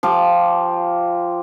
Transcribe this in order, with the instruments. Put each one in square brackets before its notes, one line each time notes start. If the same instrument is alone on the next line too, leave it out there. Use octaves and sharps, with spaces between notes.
[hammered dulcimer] F3 F4 G4 D6